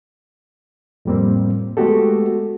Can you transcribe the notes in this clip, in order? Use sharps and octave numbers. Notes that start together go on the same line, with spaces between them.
F2 A2 G3 A#3 C4
G#3 A3 B3 F#4 G4 A4